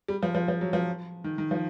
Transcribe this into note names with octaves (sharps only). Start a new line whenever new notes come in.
G3
F3
F3
F3
F#3
F3
D#3
D#3
F3